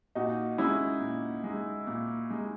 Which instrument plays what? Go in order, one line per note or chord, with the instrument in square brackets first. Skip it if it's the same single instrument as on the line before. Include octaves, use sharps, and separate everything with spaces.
[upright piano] A#2 [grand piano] D#4 F#4
[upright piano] G#3 D#4 [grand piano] C#4 E4
[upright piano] A#2
G#3 D#4
A#2
G#3 D#4